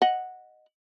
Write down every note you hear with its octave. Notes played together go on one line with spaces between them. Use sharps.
D#5 F#5